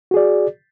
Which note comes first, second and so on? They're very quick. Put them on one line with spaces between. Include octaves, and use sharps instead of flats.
F#4 G#4 D5